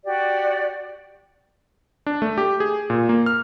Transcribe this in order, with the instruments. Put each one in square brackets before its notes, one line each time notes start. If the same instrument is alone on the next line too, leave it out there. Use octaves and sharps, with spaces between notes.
[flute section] F#4 G4 D5
[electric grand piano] D4
A3
G4
G#4
A#2
A#3
F6